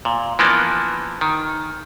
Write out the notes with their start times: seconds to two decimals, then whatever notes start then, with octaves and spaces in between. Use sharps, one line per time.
0.05 A#2
0.39 E3 F3 A#3 B3 D4
1.21 D#3